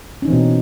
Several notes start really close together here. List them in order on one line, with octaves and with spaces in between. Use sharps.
C#4 D#4 E3 C4 B2